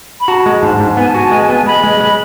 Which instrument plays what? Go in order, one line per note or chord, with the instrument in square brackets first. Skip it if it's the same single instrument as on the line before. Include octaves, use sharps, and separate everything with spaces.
[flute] B5
[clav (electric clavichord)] F#4 [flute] A5
[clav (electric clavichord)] G#3
[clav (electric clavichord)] G#2 [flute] A5
[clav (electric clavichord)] G#2
[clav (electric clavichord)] B3 [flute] G#5
[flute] A5
[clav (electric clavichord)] F#4 [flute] G#5
[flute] A5
[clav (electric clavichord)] G#3 [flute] G#5
[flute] A5
[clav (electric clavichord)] B3 [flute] G#5
[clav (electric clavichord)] G#3 [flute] B5
[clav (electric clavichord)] G#3
G#3